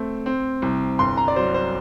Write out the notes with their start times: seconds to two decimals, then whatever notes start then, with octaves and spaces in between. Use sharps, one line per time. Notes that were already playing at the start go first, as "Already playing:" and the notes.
Already playing: A3 C4
0.26 C4
0.62 C2
0.99 G1 C6
1.17 A#5
1.28 D5
1.36 F#3 C5
1.54 C5